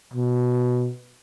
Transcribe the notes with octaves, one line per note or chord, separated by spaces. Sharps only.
B2